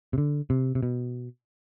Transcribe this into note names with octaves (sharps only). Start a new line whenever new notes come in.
C3
D3
C3
C3
B2